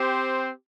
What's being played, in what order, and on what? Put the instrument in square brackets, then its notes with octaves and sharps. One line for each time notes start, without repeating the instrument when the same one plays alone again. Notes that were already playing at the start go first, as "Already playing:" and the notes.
Already playing: [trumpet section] C4 G4 C5